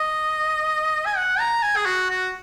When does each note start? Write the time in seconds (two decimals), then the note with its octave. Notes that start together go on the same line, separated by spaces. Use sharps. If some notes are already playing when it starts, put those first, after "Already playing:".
Already playing: D#5
1.06 G#5
1.17 F#5
1.40 A#5
1.63 G#5
1.77 G#4
1.86 F#4
2.10 F#4